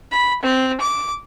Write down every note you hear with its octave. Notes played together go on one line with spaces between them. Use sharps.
B5
C4
D6